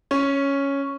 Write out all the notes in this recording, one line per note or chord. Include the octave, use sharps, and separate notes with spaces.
C#4